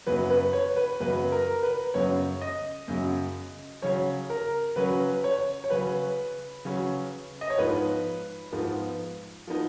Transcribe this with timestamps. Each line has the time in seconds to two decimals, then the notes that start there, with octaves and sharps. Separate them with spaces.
0.07 F#2 C#3 F#3 B4
0.30 B4
0.53 C#5
0.76 B4
1.00 F#2 C#3 F#3 B4
1.32 A#4
1.63 B4
1.94 F#2 C#3 F#3 C#5
2.41 D#5
2.88 F#2 C#3 F#3
3.82 C#3 F#3 C#4 C#5
4.30 A#4
4.76 C#3 F#3 C#4 B4
5.24 C#5
5.64 C#5
5.70 C#3 F#3 C#4 B4
6.65 C#3 F#3 C#4
7.41 D#5
7.50 C#5
7.58 G#2 F3 B3 D#4 B4
8.52 G#2 F3 B3 D#4
9.47 F3 B3 D#4